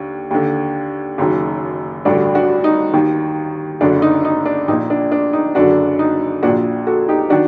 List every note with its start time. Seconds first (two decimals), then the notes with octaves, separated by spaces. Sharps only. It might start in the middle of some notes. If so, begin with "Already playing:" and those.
Already playing: D#2 D3
0.31 D#2 D3
1.18 F#1 F#2 D#3
2.05 A1 G2 D3 D4 F#4
2.34 D4 F#4
2.64 D#4
2.93 D#2 D#3
3.81 F#1 F#2 D3 D4
4.02 D#4
4.25 D#4
4.46 D4
4.68 A#1 D#4
4.72 A#2
4.90 D4
5.12 D4
5.33 D#4
5.55 F#1 F#2 D3 D4 F#4
5.99 D#4
6.43 A#2 D4 F#4
6.47 A#1
6.87 F#4 A4
7.08 D#4 G4
7.30 D#3 D4 F#4